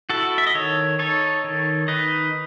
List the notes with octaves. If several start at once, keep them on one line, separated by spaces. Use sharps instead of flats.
E4 F#4 A4
E5
D#5
D#3 A4 C#5
D#4 A4 C#5
D#3
D#4 B4 D#5